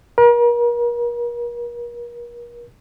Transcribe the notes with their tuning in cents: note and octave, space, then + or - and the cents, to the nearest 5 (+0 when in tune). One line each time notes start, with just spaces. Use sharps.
A#4 +40